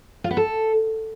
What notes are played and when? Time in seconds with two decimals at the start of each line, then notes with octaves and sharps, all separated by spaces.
0.24 F4
0.31 B3
0.37 A4